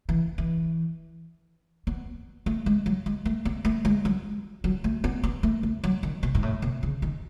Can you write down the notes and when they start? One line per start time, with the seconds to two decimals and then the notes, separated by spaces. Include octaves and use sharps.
0.09 E3
0.38 E3
1.87 B3
2.46 A3
2.66 G#3
2.86 F#3
3.06 G#3
3.25 A3
3.45 B3
3.65 A3
3.85 G#3
4.05 F#3
4.64 F#3
4.84 A3
5.04 B3
5.23 B3
5.43 A3
5.63 A3
5.84 F#3
6.03 D#3
6.23 B2
6.35 G#2
6.43 A2
6.62 B2
6.83 C#3
7.02 D#3